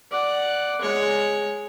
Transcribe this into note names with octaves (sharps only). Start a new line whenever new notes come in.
D5 F#5
G#3 C#5